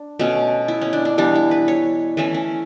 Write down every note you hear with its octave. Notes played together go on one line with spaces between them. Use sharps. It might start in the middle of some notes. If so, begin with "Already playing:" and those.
Already playing: D4
B2 A3 C#4
E4
C#4
D4
D4
E3 G3 B3 D4
E4
B4
C#5
E3 A3 C#4 B4
C#4